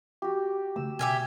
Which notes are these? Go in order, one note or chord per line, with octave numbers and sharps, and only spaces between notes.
F#4 G4
C#3 A3 E6
B2 G4 E5 G#5